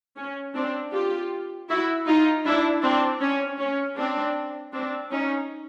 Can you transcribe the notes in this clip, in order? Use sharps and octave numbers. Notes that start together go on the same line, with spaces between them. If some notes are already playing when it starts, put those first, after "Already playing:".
C#4
C4 D4
F4 G4
E4 F#4
D#4 F4
D4 E4
C4 D4
C#4
C#4
C4 D4
C4 D4
C#4 D#4